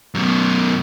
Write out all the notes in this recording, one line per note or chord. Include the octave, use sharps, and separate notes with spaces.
F#2 B2